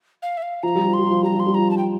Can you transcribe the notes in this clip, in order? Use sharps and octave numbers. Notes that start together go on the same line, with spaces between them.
F5
E5
F5
F3 A#5
G3
F3
C6
G3
F3
G3 A#5
F3
C6
G3
F3 A#5
A5
G5